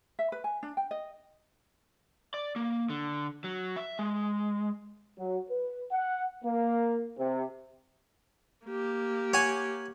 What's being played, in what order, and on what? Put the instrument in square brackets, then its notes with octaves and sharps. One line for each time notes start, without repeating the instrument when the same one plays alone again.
[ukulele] E5
B4
G#5
D4
G5
D#5
[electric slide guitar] D5
A#3
D3
F#3
E5
G#3
[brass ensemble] F#3
B4
F#5
A#3
C3
[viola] A#3 G4
[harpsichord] C#5 F#5 G#5